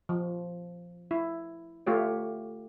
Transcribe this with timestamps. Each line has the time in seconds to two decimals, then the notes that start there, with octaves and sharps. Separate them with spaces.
0.09 F3
1.11 E4
1.87 A3 F4 G4 C#5